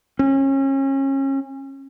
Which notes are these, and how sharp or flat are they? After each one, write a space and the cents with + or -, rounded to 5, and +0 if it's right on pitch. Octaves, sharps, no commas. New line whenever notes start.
C#4 -30